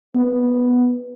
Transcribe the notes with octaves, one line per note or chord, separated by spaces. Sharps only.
B3